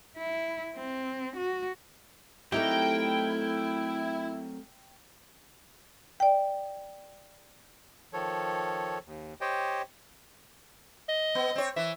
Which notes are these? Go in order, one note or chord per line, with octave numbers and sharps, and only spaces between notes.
E4
C4
F#4
F#3 A3 C4 D#4 E4 G4 A#4 G5
D5 G5
D#3 F3 A4 C#5
D#2
G4 C5 C#5 D#5 G5
D#5
B3
C4 C#5
E3 E5